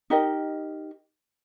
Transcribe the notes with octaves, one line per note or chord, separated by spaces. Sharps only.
D#4 G4 A#4 D#5